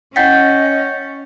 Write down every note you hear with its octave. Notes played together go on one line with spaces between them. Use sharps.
C#4 E4 D#5 F#5 G5 G6 A6 B6